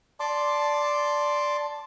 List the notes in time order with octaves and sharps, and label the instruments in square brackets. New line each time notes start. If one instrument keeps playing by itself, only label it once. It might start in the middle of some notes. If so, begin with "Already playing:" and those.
[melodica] D5 A5 C6 D6